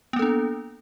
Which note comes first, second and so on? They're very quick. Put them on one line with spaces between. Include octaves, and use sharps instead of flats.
B3 A#3 A4 D4